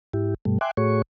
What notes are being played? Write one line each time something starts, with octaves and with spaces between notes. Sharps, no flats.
G#2 E4 G4
G2 B2 G3 A3
E5 G5 G#5 C6 D6 F#6
A2 A3 F#4 G#4 C#5 C#6